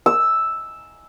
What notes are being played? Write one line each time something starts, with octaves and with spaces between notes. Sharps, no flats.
E6